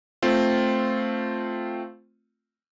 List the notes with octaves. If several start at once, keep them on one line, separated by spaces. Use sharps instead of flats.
A3 C4 F4